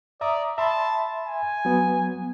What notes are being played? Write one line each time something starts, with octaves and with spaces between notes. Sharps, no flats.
D5 E5 A#5 D#6
E5 A5 B5 C6
G#5
F#3 B3